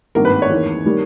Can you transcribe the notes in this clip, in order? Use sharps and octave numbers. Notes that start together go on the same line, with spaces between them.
G#1 G2 D#3 A#3 A#4
B4
C#5
E2 D#3 A#3
D#3 G3 A#3